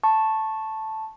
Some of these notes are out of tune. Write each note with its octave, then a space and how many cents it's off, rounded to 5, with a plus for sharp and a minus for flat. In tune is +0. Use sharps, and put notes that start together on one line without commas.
A5 +0 C#6 -15